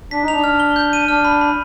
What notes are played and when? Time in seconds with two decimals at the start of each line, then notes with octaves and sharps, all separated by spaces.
0.11 D4 B6
0.23 D#4
0.28 D4 F7
0.44 F6
0.60 G7
0.76 G6
0.93 D#7
1.08 D4 F6
1.25 B5
1.41 B5